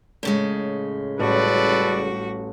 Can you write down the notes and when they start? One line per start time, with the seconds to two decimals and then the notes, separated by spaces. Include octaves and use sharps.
0.23 A2 C#3 G#3
1.19 A1 G3 F#4 A4 B4 D5